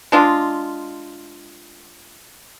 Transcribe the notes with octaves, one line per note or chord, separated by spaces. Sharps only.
G#3 D4 F4